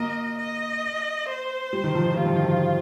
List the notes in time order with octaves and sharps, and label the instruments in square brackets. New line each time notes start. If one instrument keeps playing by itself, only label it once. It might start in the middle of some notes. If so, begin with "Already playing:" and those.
Already playing: [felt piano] A#3 [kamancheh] D#5
[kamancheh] D#5
C5
[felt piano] G3
D#3
F3
D#3
[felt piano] G3 [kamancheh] F4
[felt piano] F3
D#3
F3